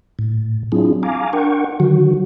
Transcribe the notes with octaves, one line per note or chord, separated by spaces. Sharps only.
A2
F#3 C4 D4 E4 F4 G#4
F5 G#5 A#5 D6
D4 A#4 F#5 G5 C#6
D3 D#3 F#3 F#4